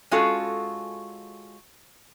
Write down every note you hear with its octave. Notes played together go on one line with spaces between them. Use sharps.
G#3 C#4 F4 F#4 A4